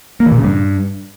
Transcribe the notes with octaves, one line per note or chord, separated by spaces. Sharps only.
A#3
E3
A#2
C#3
G2